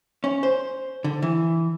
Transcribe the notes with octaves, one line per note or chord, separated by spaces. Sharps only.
C#4
C5
D3
E3